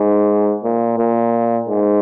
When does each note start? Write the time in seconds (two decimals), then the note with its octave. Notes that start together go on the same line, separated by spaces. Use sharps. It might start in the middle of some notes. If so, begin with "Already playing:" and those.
Already playing: G#2
0.64 A#2
0.98 A#2
1.69 G#2